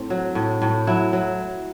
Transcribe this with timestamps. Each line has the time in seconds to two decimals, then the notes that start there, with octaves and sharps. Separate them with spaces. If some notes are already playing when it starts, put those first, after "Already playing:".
Already playing: A2 C4
0.10 F#3
0.35 A2
0.62 A2
0.87 F#3 E4
1.13 F#3